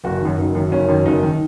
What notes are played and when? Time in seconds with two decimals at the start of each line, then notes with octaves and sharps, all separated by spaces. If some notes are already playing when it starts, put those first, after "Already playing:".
0.04 F#1 F#4
0.21 F#2 D#3
0.38 F#1 D#4
0.55 F#2 D#3
0.71 F#1 C#4
0.88 F#2 D#3
1.05 F#1 D#4
1.23 D#3